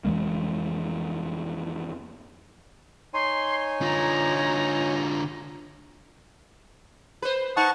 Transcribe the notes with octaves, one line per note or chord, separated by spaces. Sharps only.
F2 E3 G#3 A#3
D#4 C#5 G#5 C6
D3 F4 A#5
B4 C5
D#4 F#5 A5 C#6